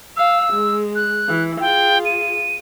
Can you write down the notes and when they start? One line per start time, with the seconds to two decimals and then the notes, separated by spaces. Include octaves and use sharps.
0.17 F5 E6
0.53 G#3
0.96 F#6
1.28 E3
1.60 F4 G#4 G5
2.05 D#7